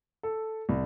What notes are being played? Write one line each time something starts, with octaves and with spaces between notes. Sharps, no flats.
A4
C2